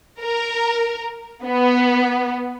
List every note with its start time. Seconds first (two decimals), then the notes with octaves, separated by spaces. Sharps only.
0.19 A#4
1.44 B3